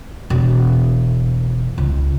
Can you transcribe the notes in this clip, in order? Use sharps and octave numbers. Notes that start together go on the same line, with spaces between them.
E1
C#2